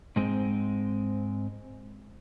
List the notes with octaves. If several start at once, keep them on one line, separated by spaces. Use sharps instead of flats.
G#2 G#3 C4